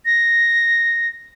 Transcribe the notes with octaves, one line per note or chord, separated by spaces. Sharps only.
A#6